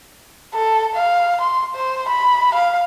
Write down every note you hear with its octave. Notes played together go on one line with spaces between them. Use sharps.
A4
F5
C6
C5
B5
F5